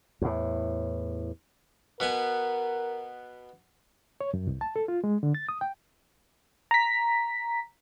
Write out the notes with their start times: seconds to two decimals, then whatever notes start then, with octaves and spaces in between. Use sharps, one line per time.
0.21 E2 A2
2.00 B2 B3 A#4 G#5
4.21 C#5
4.34 F#2
4.47 C2
4.61 A5
4.76 A4
4.88 F4
5.04 G#3
5.23 D3
5.35 A6
5.49 D#6
5.61 G5
6.71 A#5 B6